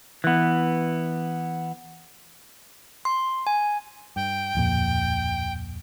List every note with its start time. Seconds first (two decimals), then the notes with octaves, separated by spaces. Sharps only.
0.24 E3 B3
3.05 C6
3.47 G#5
4.16 G2 G5
4.55 D1 F2 A#2